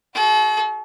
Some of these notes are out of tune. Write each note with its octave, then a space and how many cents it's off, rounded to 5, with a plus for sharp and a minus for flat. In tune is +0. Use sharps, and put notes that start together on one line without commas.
F#4 +10 A4 -45